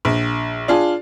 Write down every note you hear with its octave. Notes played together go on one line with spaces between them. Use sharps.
A#1
D4 F4 G#4